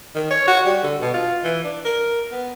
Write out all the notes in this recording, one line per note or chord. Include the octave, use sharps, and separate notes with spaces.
D#3
C#5
F#4
G3
D3
B2
F4
E3
D4
A#4
B3